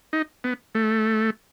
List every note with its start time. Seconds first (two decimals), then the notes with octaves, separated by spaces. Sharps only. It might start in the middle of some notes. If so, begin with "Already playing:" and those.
0.13 D#4
0.44 B3
0.75 A3